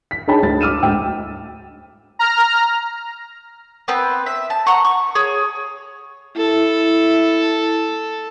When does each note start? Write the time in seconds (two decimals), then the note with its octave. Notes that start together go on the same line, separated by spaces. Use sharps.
0.11 B6
0.28 D#4 G#4 C#5 G5 A5 B5
0.43 D2 A6
0.61 D6 E6 F6 D#7 E7
0.83 D2 G#2 G5 E6
2.19 A#5 F6
3.88 B3 C4 B4
4.26 E5
4.50 A5
4.67 F#5 A#5 C#6
4.85 C#6
5.15 G#4 C#5
6.37 E4 A4